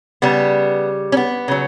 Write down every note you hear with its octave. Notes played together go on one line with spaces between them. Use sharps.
C#3 G3 B3
C#4
B3
C#3 F#3